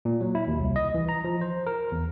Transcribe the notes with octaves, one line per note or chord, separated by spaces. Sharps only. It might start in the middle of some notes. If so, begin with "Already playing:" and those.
A#2
F#3
E4
D#2
C2
D#5
E3
A#5
F3
C5
A#4
E2